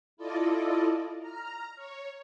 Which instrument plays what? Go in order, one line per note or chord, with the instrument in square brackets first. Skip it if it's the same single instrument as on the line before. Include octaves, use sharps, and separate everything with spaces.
[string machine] E4 F4 A4 D5 D#5
A#5 F6
C#5